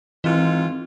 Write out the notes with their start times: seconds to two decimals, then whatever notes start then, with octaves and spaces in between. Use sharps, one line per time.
0.24 G#2 D#3 E3 C4 F4